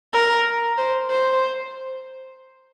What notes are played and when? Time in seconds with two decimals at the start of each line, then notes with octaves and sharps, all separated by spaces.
0.13 A#4
0.78 C5
1.10 C5